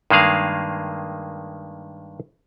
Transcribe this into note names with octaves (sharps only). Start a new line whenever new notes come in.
G2 D#3 G#3 A#3 G#4 F5